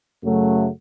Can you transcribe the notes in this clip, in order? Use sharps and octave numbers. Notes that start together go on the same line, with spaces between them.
F#2 C#3 F#3 A3